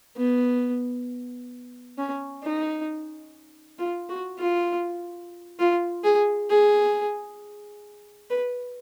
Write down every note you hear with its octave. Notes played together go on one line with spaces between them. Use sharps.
B3
C#4
D#4
F4
F#4
F4
F4
G#4
G#4
B4